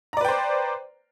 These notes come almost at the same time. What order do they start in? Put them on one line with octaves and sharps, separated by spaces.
A#5 D5 B4 G5 C5